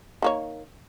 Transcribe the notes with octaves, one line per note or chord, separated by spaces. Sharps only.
D#3 A#3 C#5